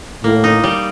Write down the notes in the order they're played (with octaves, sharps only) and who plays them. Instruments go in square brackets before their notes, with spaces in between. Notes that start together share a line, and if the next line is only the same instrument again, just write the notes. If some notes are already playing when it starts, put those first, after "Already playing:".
[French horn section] A2 [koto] A#3
[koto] D#4
G3